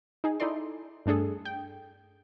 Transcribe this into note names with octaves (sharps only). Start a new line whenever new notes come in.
D#4 G#4
D#4 E4 A4 D5 C6
G2 A3 D4 G#4 A4
G5